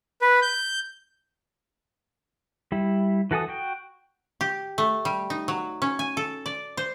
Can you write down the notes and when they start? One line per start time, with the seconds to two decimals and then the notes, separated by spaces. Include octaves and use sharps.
0.22 B4
0.42 G6
2.72 G3 E4
3.31 E3 F#4 A4 G#5 D#6
3.48 F#4 G5
4.41 G4
4.78 A3
5.05 G3
5.30 D#4
5.48 F#3
5.82 C#4
5.99 G#5
6.17 A4
6.46 D5
6.77 C5